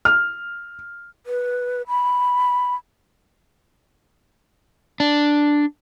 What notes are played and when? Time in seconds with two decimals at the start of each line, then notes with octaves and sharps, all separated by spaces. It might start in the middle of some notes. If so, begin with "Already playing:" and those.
0.05 F6
1.26 B4
1.88 B5
5.00 D4